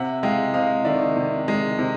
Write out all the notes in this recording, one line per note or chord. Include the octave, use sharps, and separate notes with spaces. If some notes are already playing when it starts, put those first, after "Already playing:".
Already playing: C3 E5 F#5
G#3 F5 G5
C3 D#5 F5
D#3 D5 E5
C3
G#3
C3